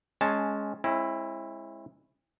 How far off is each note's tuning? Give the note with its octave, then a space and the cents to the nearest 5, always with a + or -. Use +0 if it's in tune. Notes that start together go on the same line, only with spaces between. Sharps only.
G#3 +10 C#4 +0 A5 +0
G#3 +0 C4 +45 E4 +0